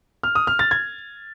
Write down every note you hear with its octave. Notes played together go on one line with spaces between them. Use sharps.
F6
D#6
F6
A6
G#6